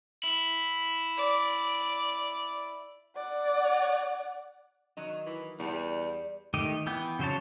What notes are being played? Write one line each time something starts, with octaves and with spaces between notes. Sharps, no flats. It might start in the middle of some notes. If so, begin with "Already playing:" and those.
E4
D5
D5 F#5
D#3 F#3 D#5
E3
E2 G3
D#3 A3 G4 D#5
E3 B3 G5
C#3 F#3 C5 C#5 A5